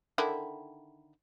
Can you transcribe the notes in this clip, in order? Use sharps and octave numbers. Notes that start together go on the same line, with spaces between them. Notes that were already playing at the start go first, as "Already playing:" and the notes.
D3 D#3 E4